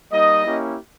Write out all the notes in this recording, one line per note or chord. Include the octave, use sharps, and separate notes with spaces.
G3 A#3 D#4 D#5
A#3 C#4 E4 G4